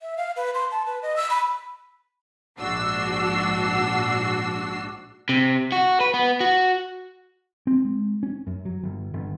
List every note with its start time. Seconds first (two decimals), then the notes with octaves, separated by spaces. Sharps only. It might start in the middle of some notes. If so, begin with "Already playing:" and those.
0.02 E5
0.17 F5
0.36 B4
0.54 C6
0.71 A5
0.86 B4
1.03 D#5
1.16 E6
1.30 B5
2.59 A#1 G#2 D4 F#4 E6 C7
5.29 C3
5.72 F#4
6.00 B4
6.14 B3
6.40 F#4
7.67 C4
7.85 G#3
8.23 C#4
8.47 F#2
8.65 F#3
8.83 G1
9.14 G1